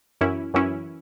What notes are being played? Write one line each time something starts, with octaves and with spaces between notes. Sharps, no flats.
F#2 E3 C#4 E4
F#2 E3 C#4 E4